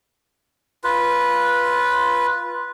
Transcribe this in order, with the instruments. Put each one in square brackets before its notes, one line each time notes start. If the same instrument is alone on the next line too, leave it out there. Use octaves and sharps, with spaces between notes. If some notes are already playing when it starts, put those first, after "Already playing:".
[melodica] F4 B4